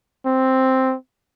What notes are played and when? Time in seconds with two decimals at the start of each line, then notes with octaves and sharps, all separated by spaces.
0.26 C4